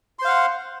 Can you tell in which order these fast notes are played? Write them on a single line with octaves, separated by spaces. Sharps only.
C6 C5 F5 F#5